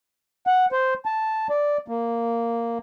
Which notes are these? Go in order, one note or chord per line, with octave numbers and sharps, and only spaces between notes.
F#5
C5
A5
D5
A#3